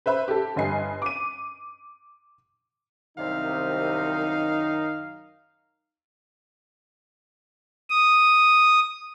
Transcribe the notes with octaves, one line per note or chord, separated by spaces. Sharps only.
B4 C5 E5 B5
G4 A4
G1 G2 D#5 G#5 C7
D6 D#7
C2 F#2 C3 D#3 D#4 F5
D#6